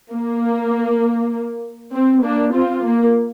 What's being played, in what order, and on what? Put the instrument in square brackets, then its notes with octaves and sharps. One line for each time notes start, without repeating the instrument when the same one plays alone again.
[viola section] A#3
C4
A#3 D4
C4 F4
A#3